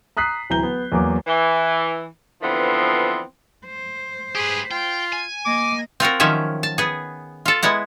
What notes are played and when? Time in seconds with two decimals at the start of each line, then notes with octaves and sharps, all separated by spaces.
0.17 A#5 D#6 F#6 B6 C7
0.50 D1 E3 A#5 G6 G7
0.63 B3
0.92 E2 F#3 A#3 D6
1.27 E3
2.42 D3 E3 F3 B3 C4
3.66 C5
4.35 G4 G#4 B4
4.71 F4 G5
5.13 G#5
5.46 A#3 D#5 D6
6.00 C4 F4 F#4 A#4
6.20 D#3 F3 F#3 C#4 E5
6.63 A5
6.78 B3 G#4
7.45 F4 A4
7.63 G#3 B3 E4 F#5